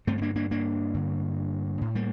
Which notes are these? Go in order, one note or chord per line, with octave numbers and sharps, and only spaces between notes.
G2 D3 A3 C4
C4
A#3 D4
A#3 D4
A#3 D4
G2 D3
A2
G3 A#3